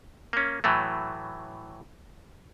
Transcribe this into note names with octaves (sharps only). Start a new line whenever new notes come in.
A#3 C#4
A2 E3 F#3 A3